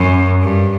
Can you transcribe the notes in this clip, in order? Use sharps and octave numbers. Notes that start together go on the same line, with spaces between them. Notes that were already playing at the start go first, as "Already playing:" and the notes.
Already playing: F#2
G2